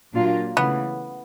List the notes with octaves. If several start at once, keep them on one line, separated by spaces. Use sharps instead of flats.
A#2 F#3 A#3 D4 F4
C#3 E3 A3 B3